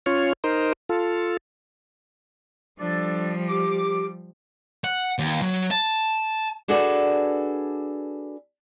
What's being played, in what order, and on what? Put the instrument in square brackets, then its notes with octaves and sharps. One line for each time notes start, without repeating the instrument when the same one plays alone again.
[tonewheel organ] C#4 F4 C#5
D#4 A#4 C5
F4 A4
[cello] F3 G3 [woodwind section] D4 A4 D5
[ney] G4 [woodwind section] D6
[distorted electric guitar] F#5
D#2
F#3
A5
[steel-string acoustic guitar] D4 F#4 G#4 A4 B4 D5